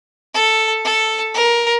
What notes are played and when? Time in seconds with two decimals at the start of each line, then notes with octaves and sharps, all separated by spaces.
0.34 A4
0.84 A4
1.34 A#4